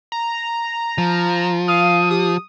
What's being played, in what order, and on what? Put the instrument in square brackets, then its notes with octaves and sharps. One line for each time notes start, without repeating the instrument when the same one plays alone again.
[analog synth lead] A#5
[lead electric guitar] F3
[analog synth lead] F5 [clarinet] D#6
[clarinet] G4 [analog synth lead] D#6